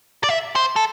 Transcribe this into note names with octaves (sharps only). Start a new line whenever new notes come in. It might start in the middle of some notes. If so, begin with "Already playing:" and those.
D5
E5
C5
A4